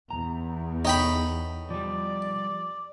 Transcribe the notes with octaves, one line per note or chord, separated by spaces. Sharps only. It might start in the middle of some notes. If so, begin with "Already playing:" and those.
E2 A#5
D#4 A4 C#5 G5 B5
F3 G3 D5